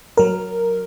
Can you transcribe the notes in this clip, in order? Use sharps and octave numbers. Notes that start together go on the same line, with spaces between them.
F#3 A#4